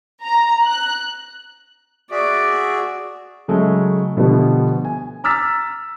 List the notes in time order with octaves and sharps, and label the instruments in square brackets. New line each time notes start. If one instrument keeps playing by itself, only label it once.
[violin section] A#5
F#6
[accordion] F#4 G#4 E5 [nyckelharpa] D5
[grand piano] C#3 F#3 G#3 A3
B2 D3 F3 G3 A3 B3
G#5
A#5 D6 E6 F6 A6 B6